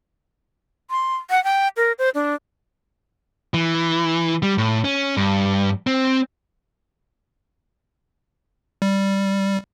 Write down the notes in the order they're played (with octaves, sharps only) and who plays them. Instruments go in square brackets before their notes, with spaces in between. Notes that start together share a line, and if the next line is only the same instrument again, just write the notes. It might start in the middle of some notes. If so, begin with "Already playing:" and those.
[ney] C6
F#5
G5
A#4
C5
D4
[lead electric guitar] E3
G3
A2
C#4
G2
C4
[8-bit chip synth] G3